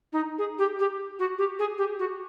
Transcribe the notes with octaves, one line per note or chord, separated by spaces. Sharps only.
D#4
G#4
G4
G4
F#4
G4
G#4
G4
F#4